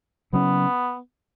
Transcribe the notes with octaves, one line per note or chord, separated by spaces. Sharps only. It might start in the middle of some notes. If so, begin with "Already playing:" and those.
C#3 F#3 B3 C#4